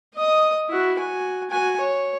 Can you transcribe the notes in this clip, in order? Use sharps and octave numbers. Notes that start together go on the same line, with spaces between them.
D#5 D#6
E4 F#4
F#4 G#5
F#4 G#5
C#5